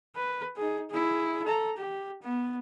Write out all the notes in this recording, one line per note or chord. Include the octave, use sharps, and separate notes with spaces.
B4
D#4 G#4
E4 G#4
A4 A#5
G4
B3